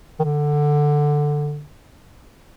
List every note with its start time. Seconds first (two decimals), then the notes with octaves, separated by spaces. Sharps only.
0.20 D#3
0.24 D3